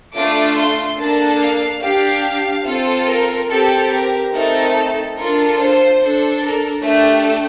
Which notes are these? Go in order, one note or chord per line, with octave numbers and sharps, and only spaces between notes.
A3 D4 F4 A4 D6
C6
A#3 D4 A4 A5
F5
D4 G4 F5
C4 F4 A4
A#4
C4 G4 A4
A#4
A3 C4 D#4 A4 A#4
D4 F4 A4 A#4
C5
D4 A4
A#4
A3 D4 G4